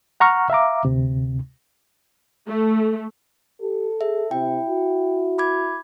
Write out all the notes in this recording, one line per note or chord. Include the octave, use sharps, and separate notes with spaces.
F#5 A#5 C#6 F6
E5 F5 A#5 D6
D2 C3
A3
G4 A4
G#4 E5
C3 E4 G5
F#4
B5 D6 G#6